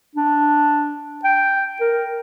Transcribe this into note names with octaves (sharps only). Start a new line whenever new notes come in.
D4
G5
A#4